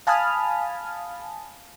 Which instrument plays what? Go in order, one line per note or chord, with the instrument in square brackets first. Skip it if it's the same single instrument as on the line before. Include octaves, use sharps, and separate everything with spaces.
[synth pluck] F5 G#5 A5 B5 D#6 F6